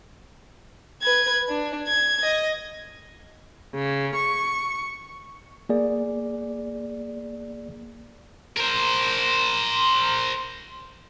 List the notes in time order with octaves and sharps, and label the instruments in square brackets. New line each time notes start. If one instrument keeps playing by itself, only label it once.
[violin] B4 G#6
D4
G#6
D#5
[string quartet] C#3
C#6
[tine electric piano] A#3 G#4 D5
[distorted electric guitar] A#4 C5